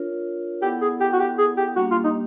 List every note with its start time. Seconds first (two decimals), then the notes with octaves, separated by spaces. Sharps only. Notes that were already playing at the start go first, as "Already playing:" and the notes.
Already playing: D4 F4 A#4 C#5
0.62 B3 E4 G4 A4 D5 F#5
0.81 G#4
1.01 G4
1.13 F#4
1.20 G4
1.38 G#4
1.57 G4
1.76 G3 A#3 D4 F#4 G4
1.91 F4
2.04 D#4